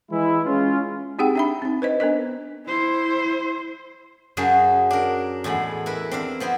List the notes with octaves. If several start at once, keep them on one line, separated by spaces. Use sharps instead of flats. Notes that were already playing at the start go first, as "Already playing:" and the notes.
E3 G#3 E4
G#3 C#4 F4
C4 D#4 G4 G#4 F#5 G5
D4 E5 B5
C4 D#4
B4 C5 D#5
B3 D4 A#4 D#5
E4 C5
F#2 C#3 F#3 G#4 A5
D4 A#4
E2 A2 G#3 B5
E4 A#4 B4
C4 D4 F5
F3 B3 C4 E4